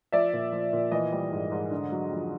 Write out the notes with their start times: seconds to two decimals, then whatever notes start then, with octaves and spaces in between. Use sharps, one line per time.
0.12 F3 D5 E5
0.33 A#2
0.52 F3
0.73 A#2
0.92 E3 D#5
1.12 G3
1.32 G#2
1.52 G#2
1.71 D3
1.92 F#3
2.11 F2